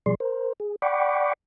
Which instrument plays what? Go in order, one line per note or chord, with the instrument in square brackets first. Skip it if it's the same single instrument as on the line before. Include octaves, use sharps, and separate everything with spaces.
[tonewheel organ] B2 F3 G3 G#4 D5 C6
A#4 C5
G#4
D5 F#5 G5 B5 C#6 D6